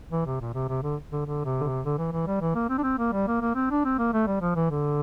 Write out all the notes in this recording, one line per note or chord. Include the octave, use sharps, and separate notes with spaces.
E3
C3
A#2
C3
C3
D3
D3
D3
C3
D3
C3
D3
E3
E3
G3
E3
A#3
C4
D4
C4
A#3
G3
A#3
A#3
C4
D4
C4
A#3
A3
G3
F3
E3
D3